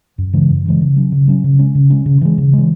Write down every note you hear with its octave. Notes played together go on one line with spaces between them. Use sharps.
F#2
C#3 E3 G#3
F#2
C#3 E3 G#3
C#3
F#3 C#4
C#3
F#3 C#4
C#3
G#3 C#4
C#3
G#3 C#4
C#3
E3 G#3
C#3
G#3
E3